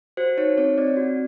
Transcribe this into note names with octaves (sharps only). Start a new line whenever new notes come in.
F#4 C5
D#4 C#5
C4 C#5
C4 D5
F#4